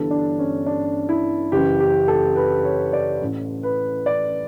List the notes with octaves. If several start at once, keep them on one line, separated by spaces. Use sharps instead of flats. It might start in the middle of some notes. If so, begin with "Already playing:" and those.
Already playing: G1 G2 E3 A4
D4
C#4
D4
E4
F#1 F#2 E3 G4
G4
A4
B4
C#5
D5
A1 A2 E3
B4
D5